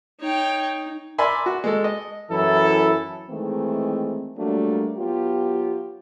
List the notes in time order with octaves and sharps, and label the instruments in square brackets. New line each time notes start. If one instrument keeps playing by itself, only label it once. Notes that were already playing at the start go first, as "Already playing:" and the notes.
[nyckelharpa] D#4 [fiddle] C#5 G5
[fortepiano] A#4 D5 E5 G#5 B5 C6
F#4
G#3 A4
D#5
[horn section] F#2 E3 E4 A4
[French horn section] D#3 E3 G#3 A3 C4
F#3 G3 A3 A#3 D4 F#4
F#3 B3 F4 G4